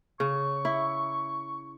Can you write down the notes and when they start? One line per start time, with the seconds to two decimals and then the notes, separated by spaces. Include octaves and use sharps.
0.20 C#3 C#6
0.65 E4